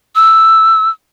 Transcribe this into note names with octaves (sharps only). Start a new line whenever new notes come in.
E6